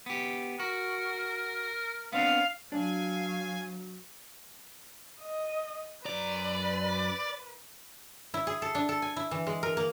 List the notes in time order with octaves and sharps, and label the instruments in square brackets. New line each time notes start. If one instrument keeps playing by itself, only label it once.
[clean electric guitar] B3 G4
[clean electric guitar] F#4 [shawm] A#4
[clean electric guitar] B3 C4 D4 [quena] F5
[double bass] F#3 [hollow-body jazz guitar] D4 [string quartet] F5 [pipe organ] G#5
[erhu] D#5
[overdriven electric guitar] F#2 A#5 [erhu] B4 [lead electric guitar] D5
[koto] E4
G#4
A4
D4
A4
G#5
E4
E3
G#3
A#4
A#3